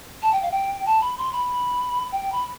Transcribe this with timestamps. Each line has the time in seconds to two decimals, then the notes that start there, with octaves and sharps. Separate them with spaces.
0.22 A5
0.32 G5
0.42 F5
0.52 G5
0.86 A5
1.01 B5
1.18 C6
1.33 B5
2.12 G5
2.32 B5